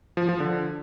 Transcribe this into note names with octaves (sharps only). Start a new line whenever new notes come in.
F3
F3
D3